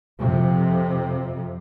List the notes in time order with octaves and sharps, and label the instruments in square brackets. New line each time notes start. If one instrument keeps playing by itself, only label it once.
[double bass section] F2 C3